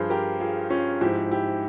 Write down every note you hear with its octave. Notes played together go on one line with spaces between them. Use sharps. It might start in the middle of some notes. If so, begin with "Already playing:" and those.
Already playing: G2 F3 G#4 C5
G4 A#4
F4 G#4
C#4 F4
G#2 F3 E4 G4
E4 G4